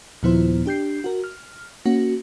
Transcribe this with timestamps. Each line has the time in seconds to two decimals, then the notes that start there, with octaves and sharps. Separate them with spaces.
0.23 D#2 A#2 F3 B3 E4 C5
0.66 D4 G4 G6 C7
1.04 F#4 A#4
1.24 F6
1.85 A#3 C#4 F#4